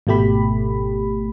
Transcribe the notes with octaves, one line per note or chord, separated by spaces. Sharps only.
G#1 B2 A3 G4 B5